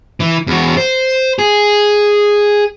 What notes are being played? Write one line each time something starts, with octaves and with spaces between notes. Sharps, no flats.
E3
E2 F#4
C5
G#4